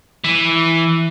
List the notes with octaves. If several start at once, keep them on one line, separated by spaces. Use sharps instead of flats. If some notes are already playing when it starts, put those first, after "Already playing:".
E3